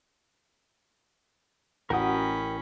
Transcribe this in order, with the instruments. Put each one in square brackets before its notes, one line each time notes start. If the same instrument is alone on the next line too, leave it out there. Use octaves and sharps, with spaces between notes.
[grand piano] A1 [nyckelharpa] C#4 B5 [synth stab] F#4 F#5 [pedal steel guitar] A#4 G5 D#6